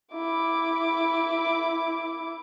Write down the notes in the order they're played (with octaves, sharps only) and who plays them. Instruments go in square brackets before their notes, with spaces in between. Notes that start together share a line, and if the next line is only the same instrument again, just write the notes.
[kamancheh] E4 D6